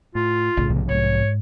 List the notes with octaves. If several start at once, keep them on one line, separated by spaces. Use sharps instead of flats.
A2 F4
B1 A2 C#3
B1 C3 F3
G#2 C#5